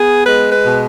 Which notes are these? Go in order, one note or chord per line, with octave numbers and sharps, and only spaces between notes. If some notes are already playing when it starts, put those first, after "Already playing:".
Already playing: B3 G#4
G#3 B4
B4
B2